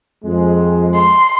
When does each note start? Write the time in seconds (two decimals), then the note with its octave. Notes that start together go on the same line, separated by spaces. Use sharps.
0.24 F2 G#3
0.94 C6